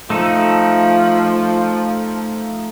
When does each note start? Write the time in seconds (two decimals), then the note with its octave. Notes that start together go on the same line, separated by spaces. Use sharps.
0.10 F3 A3 D#4 A4